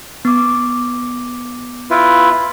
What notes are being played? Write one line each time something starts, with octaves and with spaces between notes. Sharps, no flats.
B3 D6
E4 F4 B4